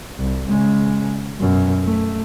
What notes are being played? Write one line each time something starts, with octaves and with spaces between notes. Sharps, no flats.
C2
C#3 G#3
F#2 B2
A3